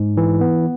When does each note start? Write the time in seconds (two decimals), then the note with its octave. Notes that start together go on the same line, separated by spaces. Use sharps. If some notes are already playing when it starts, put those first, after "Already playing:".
Already playing: G#2
0.17 E3
0.41 B3